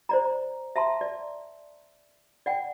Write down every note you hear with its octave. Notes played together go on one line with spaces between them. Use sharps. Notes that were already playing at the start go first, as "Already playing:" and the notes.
C5 D5 A#5
E5 A5 A#5 C6
D5
D5 F#5 G5